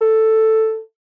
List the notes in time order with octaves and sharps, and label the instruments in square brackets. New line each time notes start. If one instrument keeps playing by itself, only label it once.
[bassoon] A4